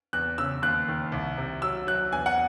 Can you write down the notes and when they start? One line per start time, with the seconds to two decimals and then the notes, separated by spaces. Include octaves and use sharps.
0.13 E2 F#6
0.38 C#3 E6
0.62 D#2 F#6
0.88 D#3
1.12 C2
1.38 C3
1.62 F#3 E6
1.87 F#3 F#6
2.12 E2 G#5
2.26 F#5